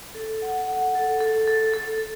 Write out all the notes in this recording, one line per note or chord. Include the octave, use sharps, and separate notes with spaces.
A4
F#5
F#5
A4
A4
A4
A4